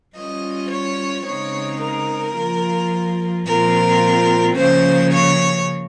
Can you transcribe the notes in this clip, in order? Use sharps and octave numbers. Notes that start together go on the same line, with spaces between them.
G3 C#4 F4 D#5
C#5
C#3 G#3 C4 D#4 C#5
A#4
F3 A#3 F4
A#2 F3 C4 F4 A#4
C#3 F3 A#3 C#4 C5
C#5